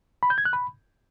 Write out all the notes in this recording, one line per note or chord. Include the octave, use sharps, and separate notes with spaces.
B5
G6
G#6
F#6
B5